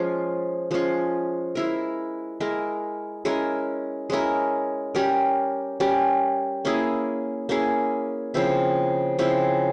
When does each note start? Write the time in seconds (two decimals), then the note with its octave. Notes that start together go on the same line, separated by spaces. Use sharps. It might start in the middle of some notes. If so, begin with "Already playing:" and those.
Already playing: F3 G#3 C#4 F4
0.71 F3 G#3 C#4 F4
1.55 G#3 E4 A#4
2.40 G#3 E4 A#4
3.25 G#3 C#4 E4 A#4
4.10 G#3 C#4 E4 A#4
4.95 G3 C#4 G4 A#4
5.80 G3 C#4 G4 A#4
6.65 A#3 C#4 E4 G#4
7.49 A#3 C#4 E4 G#4
8.34 C#3 F3 C4 E4
9.19 C#3 F3 C4 E4